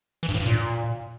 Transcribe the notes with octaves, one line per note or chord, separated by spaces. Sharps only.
E3
G2
A2
G2
A#2